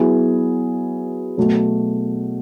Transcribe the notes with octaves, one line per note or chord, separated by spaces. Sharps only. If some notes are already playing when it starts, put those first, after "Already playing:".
Already playing: F#3 B3 E4 G#4
B2 F#3 A3